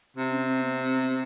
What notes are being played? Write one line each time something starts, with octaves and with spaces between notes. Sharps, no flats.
C3 C4
C#4
C4
B3
C4